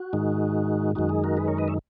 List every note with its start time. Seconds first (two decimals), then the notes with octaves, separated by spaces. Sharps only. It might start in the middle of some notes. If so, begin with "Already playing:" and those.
Already playing: F#4
0.13 G#2 D#3 G#3 D#4
0.95 F#2 D#3 G#3 D#4 F#4
1.09 G#4
1.24 F#4 A#4
1.37 G#4 B4
1.48 A#4 C#5
1.57 B4 D#5
1.68 C#5 E5